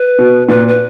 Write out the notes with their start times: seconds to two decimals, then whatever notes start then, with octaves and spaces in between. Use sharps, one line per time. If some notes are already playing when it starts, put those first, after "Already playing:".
Already playing: B4
0.19 B2
0.49 A#2 B4
0.68 B4